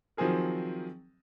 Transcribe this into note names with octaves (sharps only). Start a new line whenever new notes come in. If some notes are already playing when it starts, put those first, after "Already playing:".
D#3 F3 F#3 C4 G#4 A#4